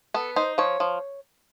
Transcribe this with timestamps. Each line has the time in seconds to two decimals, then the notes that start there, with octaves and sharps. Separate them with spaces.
0.14 B3 A4
0.36 D#4 C5
0.58 F3 C#5
0.80 F3